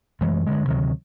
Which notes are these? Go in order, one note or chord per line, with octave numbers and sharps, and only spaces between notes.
F#2 E3 G#3 A3
G2 D3 G#3
D2 C3 D#3 F#3